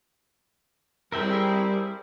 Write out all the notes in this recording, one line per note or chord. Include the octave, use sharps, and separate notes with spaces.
G3 C4 E4 G#4 A#4 E5 G5